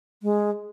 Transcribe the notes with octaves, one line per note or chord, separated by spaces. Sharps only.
G#3